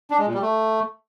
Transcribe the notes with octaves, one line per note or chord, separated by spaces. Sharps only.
D4
G#3
A#2
G3
A3